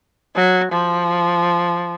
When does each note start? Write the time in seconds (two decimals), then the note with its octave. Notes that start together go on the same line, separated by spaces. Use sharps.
0.35 F#3
0.72 F3